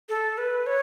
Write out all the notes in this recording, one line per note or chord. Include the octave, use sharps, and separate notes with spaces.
A4
B4
C#5